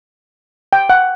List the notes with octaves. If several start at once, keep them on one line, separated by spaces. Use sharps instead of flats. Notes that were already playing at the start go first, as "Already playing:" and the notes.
G5
F#5